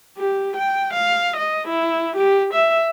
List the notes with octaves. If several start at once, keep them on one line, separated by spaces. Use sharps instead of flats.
G4
G5
F5
D#5
E4
G4
E5